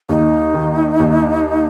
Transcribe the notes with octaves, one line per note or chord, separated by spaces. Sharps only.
D#2 D#4
D#3
D#2